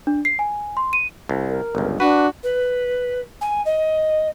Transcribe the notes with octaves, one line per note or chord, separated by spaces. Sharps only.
D4
C7
G#5
C6
D#7
C2
A#4
G1 C#2
D4 F#4 B4
B4
G#5
D#5